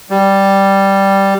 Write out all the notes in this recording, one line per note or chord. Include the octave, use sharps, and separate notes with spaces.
G3